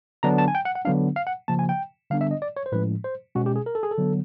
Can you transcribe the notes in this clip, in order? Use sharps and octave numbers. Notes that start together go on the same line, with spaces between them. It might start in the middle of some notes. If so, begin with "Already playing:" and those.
D3 F#3 B3 D4 A#5
A5
G#5
G5
F#5
F#5
D3 F#3 B3 D4 F5
F5
F#5
C#3 F3 A#3 A5
G#5
G5
D3 G3 B3 D4 F5
E5
D#5
D5
C#5
C5
A2 F3 G#3 C#4 B4
C5
B2 G#3 C#4 F#4
G4
G#4
A#4
A4
G#4
A4
D3 F#3 B3